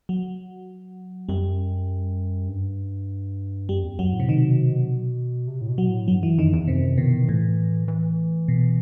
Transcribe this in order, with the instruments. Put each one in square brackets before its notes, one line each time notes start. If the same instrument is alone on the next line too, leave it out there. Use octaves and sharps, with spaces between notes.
[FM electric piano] F#3
[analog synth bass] F#2 [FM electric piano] G3
[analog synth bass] G2
[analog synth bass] F#2 [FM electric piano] G3
[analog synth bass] E2
[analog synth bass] F#2 [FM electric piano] F#3
[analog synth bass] A2
[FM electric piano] C3
[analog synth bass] B2 [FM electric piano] D#3
[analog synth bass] C3
A2
B2
[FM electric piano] F#3
[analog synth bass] A2
[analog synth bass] G2 [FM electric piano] F#3
[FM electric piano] E3
[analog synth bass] F#2 [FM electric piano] D#3
[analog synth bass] E2 [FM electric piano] D#3
[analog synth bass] F#2 [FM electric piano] C3
[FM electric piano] B2 [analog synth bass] D#3
[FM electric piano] A2 [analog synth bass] E3
[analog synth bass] E3
[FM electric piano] B2